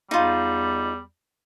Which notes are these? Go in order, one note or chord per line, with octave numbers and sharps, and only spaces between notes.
E2 G3 D#4 F4